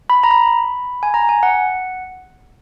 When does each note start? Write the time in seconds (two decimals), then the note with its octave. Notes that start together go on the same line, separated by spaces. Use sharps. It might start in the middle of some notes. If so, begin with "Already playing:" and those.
0.10 B5
0.24 A#5
0.31 B5
1.03 G#5
1.14 A#5
1.29 G#5
1.43 F#5